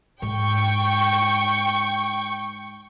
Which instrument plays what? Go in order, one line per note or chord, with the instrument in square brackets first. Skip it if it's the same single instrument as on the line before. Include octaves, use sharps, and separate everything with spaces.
[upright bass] G#2 [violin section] G5 C#6